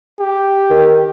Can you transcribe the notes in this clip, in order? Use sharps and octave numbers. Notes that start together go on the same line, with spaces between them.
G4
D#3